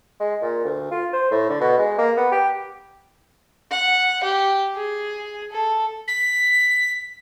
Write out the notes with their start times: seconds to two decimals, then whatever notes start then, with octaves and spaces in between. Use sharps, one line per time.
0.20 G#3
0.42 A#2
0.65 D2
0.91 F4
1.13 C5
1.31 A2
1.49 D3
1.61 B2
1.78 G#3
1.98 A#3
2.17 B3
2.32 G4
3.71 F#5
4.23 G4
4.75 G#4
5.52 A4
6.08 B6